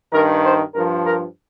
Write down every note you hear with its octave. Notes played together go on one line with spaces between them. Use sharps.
G2 D#3 A#4
C5
G2 F3 A#4
A#4